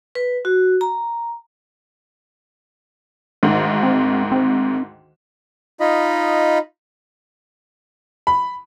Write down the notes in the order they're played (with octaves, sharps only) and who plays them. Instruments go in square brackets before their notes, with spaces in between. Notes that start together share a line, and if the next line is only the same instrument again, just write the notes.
[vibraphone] B4
F#4
A#5
[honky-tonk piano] D2 G#2 D#3
[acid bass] C4
C4
[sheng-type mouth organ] D#4 F4 D#5 B5
[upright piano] B5